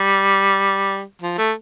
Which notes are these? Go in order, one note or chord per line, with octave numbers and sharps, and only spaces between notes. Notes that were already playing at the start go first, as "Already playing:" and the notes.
Already playing: G3
F3
A3